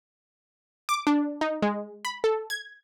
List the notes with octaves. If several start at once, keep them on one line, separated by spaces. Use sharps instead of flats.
D6
D4
D#4
G#3
B5
A4
G#6